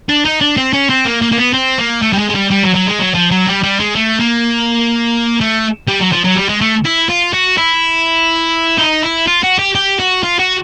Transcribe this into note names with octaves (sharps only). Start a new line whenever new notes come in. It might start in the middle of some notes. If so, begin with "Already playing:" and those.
D4
D#4
D4
C4
C#4
C4
A#3
A#3
A#3
B3
C4
A#3
A3
G3
G#3
G#3
G3
G3
F#3
F#3
G#3
F#3
F3
F#3
G3
G3
G#3
A3
A#3
A3
G3
F#3
F3
F#3
G3
G#3
A3
E4
F4
F#4
E4
D#4
E4
F4
F#4
G4
G4
F#4
F4
F#4